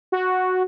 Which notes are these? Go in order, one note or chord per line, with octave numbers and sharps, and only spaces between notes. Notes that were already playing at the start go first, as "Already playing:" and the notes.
F#4